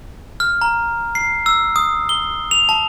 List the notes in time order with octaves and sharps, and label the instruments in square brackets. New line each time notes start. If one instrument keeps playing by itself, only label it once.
[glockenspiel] F6
A#5
C7
E6
D#6
G7
F7
A5